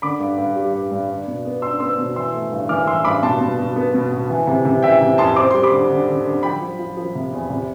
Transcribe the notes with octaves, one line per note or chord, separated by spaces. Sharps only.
D3 B5 D6
G2
G2
G3
G2
G2
D4
B2
B3
D4 C6 E6
B3 C6 E6
B2
E3 C6 E6
A3
G2
E3 D6 F6
E3 C6 E6
G2 B5 D6
B2 A5 C6
B2
B2
B3
B2
B2
E3
C3
C3
E3 E5 G5
C3
F2 A5 C6
C4 D6
G3 C6
B5 D6
D3
D3
D3
D3
F3 G5 B5
F3
F3
F3
C3
E2
C3